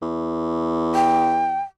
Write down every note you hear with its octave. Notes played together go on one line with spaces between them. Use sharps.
E2
G5